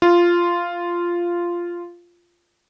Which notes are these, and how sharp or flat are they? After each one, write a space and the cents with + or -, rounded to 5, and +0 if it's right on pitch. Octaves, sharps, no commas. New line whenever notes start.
F4 -10